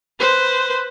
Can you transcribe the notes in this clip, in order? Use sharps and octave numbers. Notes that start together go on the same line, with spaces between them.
B4 C5